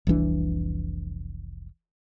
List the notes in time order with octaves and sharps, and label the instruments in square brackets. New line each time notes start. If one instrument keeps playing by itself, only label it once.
[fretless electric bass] F1 C2 E3 D4